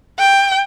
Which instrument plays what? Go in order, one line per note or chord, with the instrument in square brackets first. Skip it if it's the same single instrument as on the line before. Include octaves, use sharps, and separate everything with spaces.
[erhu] G5